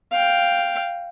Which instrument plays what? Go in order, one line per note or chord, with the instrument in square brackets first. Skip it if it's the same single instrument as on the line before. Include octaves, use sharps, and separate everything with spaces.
[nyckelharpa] F5 G5